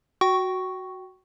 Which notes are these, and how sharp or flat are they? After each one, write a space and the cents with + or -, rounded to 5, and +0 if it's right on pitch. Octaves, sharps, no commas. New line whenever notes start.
F#4 +0 G5 -25 C#6 +0